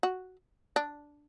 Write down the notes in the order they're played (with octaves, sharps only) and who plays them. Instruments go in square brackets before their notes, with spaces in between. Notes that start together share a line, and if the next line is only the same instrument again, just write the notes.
[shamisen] F#4
D4